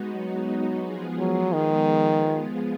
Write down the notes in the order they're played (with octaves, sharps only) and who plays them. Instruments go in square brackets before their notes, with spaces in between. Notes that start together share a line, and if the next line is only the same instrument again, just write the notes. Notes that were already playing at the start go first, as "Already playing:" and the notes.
Already playing: [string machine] G#3 B3 D#4 F#4
[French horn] F#3
[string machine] F3 G#3 B3 F4 G#4
[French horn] F#3
D#3